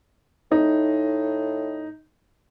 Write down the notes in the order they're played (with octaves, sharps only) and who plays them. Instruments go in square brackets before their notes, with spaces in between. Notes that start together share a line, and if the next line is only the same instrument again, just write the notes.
[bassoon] A2 [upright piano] D#4